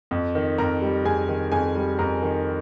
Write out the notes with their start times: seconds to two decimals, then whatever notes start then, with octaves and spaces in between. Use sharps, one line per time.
0.11 F2
0.35 D#3
0.58 F2 A#4 A#5
0.81 G3
1.05 F2 G#4 G#5
1.28 D#3
1.52 F2 G#4 G#5
1.75 G3
1.99 F2 A#4 A#5
2.23 D#3